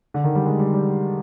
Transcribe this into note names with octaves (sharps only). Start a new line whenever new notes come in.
D3
D#3
G3
G#3
G3
G3